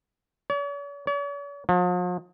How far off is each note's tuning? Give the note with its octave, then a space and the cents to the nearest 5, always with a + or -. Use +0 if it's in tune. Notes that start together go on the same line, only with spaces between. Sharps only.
C#5 +45
C#5 +45
F3 +40